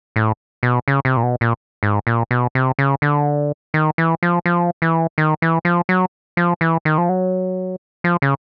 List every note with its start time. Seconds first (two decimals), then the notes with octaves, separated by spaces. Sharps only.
0.16 A2
0.63 B2
0.88 C#3
1.05 C3
1.17 A#2
1.23 B2
1.41 A#2
1.83 G#2
2.07 A#2
2.31 B2
2.55 C3
2.79 C#3
3.02 D3
3.74 D#3
3.98 E3
4.23 F3
4.46 F3
4.82 E3
5.18 D#3
5.42 E3
5.65 F3
5.89 F#3
6.37 F3
6.61 E3
6.85 D#3
6.98 F3
7.09 F#3
8.04 F3
8.22 C#3